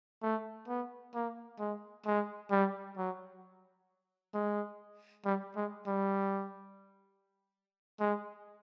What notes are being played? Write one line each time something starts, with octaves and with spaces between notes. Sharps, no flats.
A3
B3
A#3
G#3
G#3
G3
F#3
G#3
G3
G#3
G3
G#3